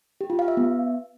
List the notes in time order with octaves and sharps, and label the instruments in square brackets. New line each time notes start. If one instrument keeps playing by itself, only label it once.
[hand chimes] G4
F4
F5
E5
B3